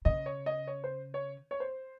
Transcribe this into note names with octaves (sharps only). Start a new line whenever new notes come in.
C#3 D#5
C#5
D#5
C#5
C5
C#5
C#5
C5